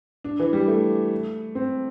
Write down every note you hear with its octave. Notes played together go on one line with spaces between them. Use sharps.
D4
E3
G3
A3
C4